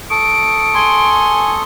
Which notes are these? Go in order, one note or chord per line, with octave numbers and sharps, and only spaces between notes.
A4 C#6 D#6 D7
G#5 C6